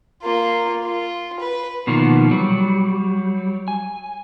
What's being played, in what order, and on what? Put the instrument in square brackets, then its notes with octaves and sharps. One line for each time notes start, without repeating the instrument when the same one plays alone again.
[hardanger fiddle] A#3 F4
F4
B4
[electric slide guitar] B2 D#3 F3 A#3 B3
F#3 G3
G#5